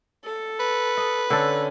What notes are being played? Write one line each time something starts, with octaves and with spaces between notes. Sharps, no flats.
A4
B4
D#5
D3 C#4 A4